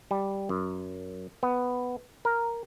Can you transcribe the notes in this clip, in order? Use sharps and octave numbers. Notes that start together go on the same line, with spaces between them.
G3
F#2
B3
A#4